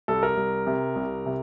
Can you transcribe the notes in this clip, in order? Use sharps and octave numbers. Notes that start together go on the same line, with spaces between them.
C2 A4
A#4
C2
C3
C2
C3